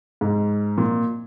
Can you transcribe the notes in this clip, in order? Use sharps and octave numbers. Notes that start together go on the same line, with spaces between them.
G#2
A#2